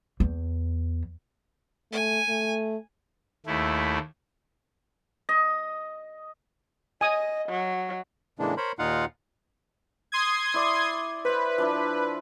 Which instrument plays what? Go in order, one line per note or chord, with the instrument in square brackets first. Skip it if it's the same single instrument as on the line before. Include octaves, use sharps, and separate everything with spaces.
[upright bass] E2
[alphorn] A3 [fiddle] G#5
[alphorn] A3
[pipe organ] D#2 A3 E4
[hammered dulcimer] D#5
[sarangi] D#5 [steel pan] G#5 D#6
[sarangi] F#3
[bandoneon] A2 C#3 E3 G#3 A#3 D4
A#4 C5 C#5 B5
D#2 A#2 D#4 F4 F5 F#5
[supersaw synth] C6 D#6 G#6
[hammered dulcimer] E4 D5
[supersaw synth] B4 [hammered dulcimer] C5 E5
[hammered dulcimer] F3 D4 E4